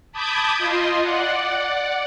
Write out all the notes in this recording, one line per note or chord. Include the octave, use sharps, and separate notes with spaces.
A5 B5 D6 D#6 G6 G#6
F4 D#5 C6
D5 F#5